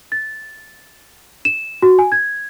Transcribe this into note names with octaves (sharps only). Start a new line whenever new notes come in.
A6
E7
F#4
G#5
G#6